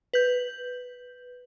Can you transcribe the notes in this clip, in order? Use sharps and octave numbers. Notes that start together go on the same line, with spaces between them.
B4 G6